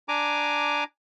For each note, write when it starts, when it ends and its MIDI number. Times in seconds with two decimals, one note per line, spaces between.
0.09 0.84 62
0.09 0.84 80
0.09 0.84 82
0.09 0.84 86